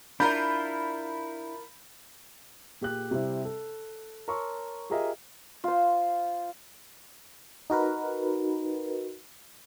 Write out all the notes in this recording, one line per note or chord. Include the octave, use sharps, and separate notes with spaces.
D4 E4 F4 A#4 B5 G6
A#2 G4 G#4 F#6
C3 G3 C4 E4
A4
A#4 C#5 A5 C6 C#6 E6
F4 G4 G#4 A#4 D#5 E5
F4 C5
D#4 F#4 A#4 B4